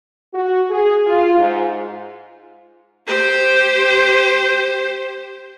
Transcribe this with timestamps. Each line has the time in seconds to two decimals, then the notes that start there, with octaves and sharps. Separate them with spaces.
0.33 F#4
0.70 G#4
1.07 F4
1.38 G#2
3.07 G4 C5